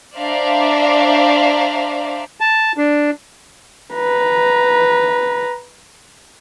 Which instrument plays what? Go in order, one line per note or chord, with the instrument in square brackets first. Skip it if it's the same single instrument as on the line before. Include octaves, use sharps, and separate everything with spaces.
[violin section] D4 C5 D5 E5 F5 A#5
[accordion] A5
D4
[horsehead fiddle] B4 A#5